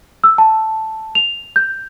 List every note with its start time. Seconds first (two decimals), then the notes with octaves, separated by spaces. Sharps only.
0.24 E6
0.38 A5
1.15 F7
1.56 G6